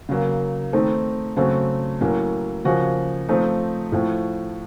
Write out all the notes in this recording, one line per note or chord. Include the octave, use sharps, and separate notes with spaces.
C#3 F#3 A#3
D#3 A3 C4 D#4
C#3 F#3 A3 C4 F#4
A2 F#3 A#3 C#4
C#3 F3 A#3 C#4 F#4
F3 A3 C4 D#4
A2 F3 A3